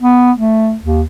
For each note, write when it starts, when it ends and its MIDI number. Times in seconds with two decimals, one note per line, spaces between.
0.02 0.32 59
0.37 0.76 57
0.82 1.03 39